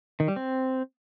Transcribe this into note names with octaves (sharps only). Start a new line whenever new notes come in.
D#3
G3
C4